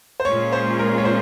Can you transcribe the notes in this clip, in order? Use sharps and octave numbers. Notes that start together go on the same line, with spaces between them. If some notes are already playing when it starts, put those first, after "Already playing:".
C5
A#2 G#3 C#4 F4 G#4 C#5
C5
A#4
C#5
C5